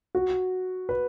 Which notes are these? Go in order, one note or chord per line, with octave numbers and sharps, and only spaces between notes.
F#4
B4